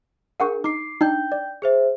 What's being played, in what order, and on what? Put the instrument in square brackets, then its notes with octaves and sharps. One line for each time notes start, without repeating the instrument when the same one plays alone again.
[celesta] D4 G#4 A#4 [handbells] F5 F#5 C#6
[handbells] D#4 [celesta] D6 C7
[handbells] D4 D#4 [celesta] G5 G6
[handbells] D5
[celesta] G#4 C5 E5